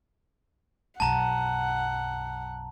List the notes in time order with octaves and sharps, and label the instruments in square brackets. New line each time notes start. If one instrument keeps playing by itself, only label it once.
[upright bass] B1 F#2 [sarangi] F#5 [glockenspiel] A5 A#5